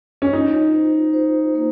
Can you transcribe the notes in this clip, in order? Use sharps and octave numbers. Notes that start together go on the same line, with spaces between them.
C#4
D#4 F4
C5
C5
A#3